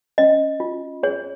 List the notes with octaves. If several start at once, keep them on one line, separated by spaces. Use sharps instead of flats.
C#4 D#5
F4
G#4 C#5